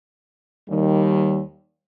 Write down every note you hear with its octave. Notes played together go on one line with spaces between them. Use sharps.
D#2 D#3 G3